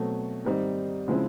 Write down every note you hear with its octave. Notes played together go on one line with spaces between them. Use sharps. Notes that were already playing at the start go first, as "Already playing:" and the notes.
Already playing: B2 F#3 A3 C4
G#2 D#3 G3 C4 D#4
C#3 F3 G#3 C4 E4